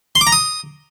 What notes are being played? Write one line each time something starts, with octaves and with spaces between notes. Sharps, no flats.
C6
D6
A#5
D#6